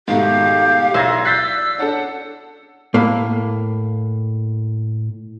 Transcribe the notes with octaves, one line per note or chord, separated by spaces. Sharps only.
G#2 B2 D#3 A3 G4 F5
B1 E4 D5 C6 E6 G#6 A#6
E6 F#6 G6 A6 B6 C7
C#4 D4 A4 F#5
A2 A#3